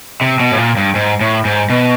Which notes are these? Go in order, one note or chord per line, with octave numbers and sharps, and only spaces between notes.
C3
B2
A2
A#2
G2
G#2
A2
G#2
B2